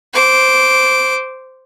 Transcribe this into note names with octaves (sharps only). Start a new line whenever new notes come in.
C5 D6